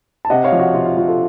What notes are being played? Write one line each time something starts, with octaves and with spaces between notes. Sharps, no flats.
A5
C3 D#5 F#5
C#5 F5
F3
F#4
C3 F4
F4
F3 F#4
F4 A4